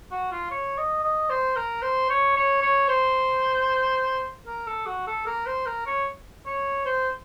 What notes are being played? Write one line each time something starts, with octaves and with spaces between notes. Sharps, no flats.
F#4
F4
C#5
D#5
D#5
C5
A#4
C5
C#5
C#5
C#5
C5
A#4
A4
F#4
A4
A#4
C5
A#4
C#5
C#5
C5